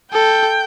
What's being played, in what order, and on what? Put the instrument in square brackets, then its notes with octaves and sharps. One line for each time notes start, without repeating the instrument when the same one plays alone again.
[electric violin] A4 [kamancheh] G5